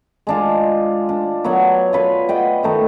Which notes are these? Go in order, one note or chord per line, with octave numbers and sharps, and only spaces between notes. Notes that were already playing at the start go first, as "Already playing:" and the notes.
G#3 D4 F4
D4
F#3 B3 C#5 F#5
F4 B4 C#5
D5 D#5 F#5 G5
D#3 A3 D#4